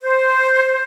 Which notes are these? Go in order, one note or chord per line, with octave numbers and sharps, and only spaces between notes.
C5